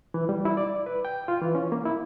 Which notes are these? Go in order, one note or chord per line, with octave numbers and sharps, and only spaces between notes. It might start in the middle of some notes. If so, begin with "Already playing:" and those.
E3
G3
E4
D5
B4
G5
F4
E3
C#4
A#3
E4